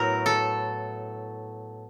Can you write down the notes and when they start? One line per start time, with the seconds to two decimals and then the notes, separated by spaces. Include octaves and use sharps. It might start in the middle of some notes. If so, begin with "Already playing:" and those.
Already playing: A2 F#3 B3 E4 A#4
0.26 A4